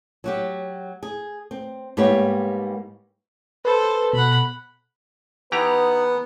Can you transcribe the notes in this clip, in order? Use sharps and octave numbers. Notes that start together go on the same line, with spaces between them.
F#3 F#4 G4
G#4
C4
G#2 G3 A#3 B3 G4 C#5
A4 B4 C5
B2 F#5 B5
E3 B3 D#4 G4 B4 F#5 A#5